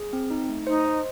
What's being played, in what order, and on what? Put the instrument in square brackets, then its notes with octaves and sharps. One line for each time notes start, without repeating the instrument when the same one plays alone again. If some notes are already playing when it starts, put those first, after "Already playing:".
Already playing: [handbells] G#4
C4
D#4
A3
[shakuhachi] D#4 [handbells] C5
[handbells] D#5